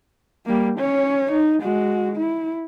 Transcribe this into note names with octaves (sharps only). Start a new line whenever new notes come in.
G3 A#3
C#4 C#5
D#4
G#3 F#4
E4